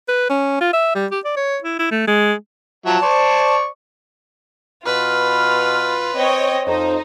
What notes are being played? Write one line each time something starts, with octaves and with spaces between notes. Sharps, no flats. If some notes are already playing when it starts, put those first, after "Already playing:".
B4
C#4
F4
E5
G3
G4
D5
C#5
E4
E4
A3
G#3
F3 F#3 E5 A5
C5 D5 C#6
B2 F4 B4 B5 F6
C4 C#5 D#5 G5
F2 D#4 C5